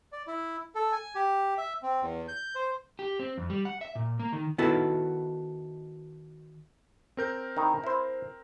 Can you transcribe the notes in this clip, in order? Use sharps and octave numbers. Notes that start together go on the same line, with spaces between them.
D5
E4
A4
G#5
G4
E5
C4
E2
G6
C5
G4
C4
F2
G3
F#5
E5
A#2
A#3
D#3
D#3 B3 E4 F#4 A4
C4 A#4 G6
D#3 D#4 E4
E4 C5